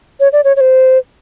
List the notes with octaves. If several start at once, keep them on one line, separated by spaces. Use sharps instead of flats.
C#5
D5
C#5
C#5
C5